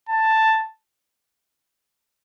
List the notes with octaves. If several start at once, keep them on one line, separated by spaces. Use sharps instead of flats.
A5